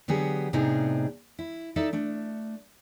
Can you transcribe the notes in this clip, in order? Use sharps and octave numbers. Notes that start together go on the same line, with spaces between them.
D3 F#3 B3 G4 G#4
A2 C3 B3 D4 D#4 G#4
E4
D#4 A4 D5 E5
A3 D4